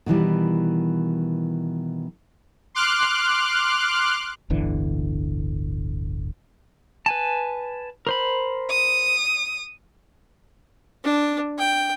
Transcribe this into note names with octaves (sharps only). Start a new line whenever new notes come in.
B2 D#3 E3 G3
C6 D6 F6 F#6
D1 G1 D3 E3
B4 G#5 A5
A#4 C5 B5
D#6
D4
G5